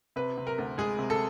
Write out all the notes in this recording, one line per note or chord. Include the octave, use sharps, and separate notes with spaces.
C3 B4
C3
A#4
D2
G#3 G#4
C3
A4